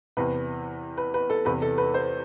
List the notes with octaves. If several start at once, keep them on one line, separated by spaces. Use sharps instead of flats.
E2 C3 E3 B4
B4
B4
A4
E2 C3 E3 B4
A4
B4
C5